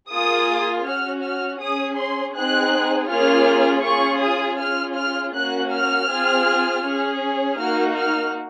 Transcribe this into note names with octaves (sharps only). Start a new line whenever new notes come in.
A#3 F4 G#4 D#6
C#4 F#4 F6
F6
C#4 G#4 D#6
C6
C4 D#4 G#4 F#6
A#3 C#4 F4 G#4 F6
C#4 F4 G#4 C#6
D#6
C#4 F4 G#4 F6
F6
A#3 C#4 F#4 F#6
F6
C4 F4 G#4
C#4 G#4
A#3 D#4 F#4 F6
F6